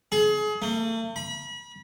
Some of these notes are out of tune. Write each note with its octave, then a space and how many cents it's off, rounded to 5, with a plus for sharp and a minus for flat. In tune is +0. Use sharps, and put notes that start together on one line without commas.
G#4 +30
A3 +45
B5 -35